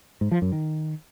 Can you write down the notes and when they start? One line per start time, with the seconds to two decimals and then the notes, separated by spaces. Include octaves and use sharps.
0.21 G#2
0.31 F3
0.42 F#2
0.52 D#3